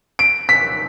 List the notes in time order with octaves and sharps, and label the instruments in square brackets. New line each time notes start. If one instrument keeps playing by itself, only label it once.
[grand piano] D7
B6